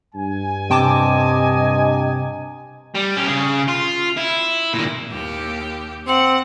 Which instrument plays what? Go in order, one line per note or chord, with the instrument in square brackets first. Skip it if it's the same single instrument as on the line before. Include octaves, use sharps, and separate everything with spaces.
[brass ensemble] G2 G#5
[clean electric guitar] C3 [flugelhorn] D#5 [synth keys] G5 A5 D6
[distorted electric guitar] G3
C#4 G4
C#3 G#4
F4
E4
A#2 D#3
[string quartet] D#2 G4
[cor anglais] C4 [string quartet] F#5